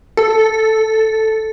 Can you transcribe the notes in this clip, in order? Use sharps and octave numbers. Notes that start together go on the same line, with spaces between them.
A4